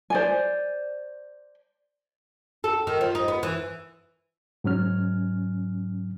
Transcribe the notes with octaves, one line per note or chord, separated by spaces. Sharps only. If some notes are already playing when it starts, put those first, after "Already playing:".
C5 D5 G#5
A4
D#3
F3
D#4
B3
E3
G#2 F#3 C#4 F6